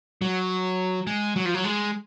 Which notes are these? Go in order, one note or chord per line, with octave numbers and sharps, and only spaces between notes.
F#3
G#3
F#3
F3
F#3
G#3